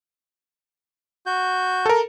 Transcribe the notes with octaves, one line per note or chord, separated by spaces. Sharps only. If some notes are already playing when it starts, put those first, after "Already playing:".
F#4 G6
A4 A#4